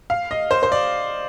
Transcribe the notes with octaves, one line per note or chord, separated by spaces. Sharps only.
F5
D#5
C5
C5
D5